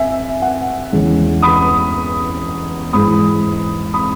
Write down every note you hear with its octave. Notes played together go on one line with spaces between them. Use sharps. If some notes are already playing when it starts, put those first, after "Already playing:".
Already playing: E5 G#5
F#5
E2 C#3 E3 G#3 C#4
B5 D#6
G#2 E3 G#3 B5 D#6
B5 D#6